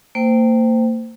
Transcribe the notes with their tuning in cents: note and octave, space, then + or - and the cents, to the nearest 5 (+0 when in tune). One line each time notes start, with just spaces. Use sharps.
A#3 -35 C5 -15 G5 +0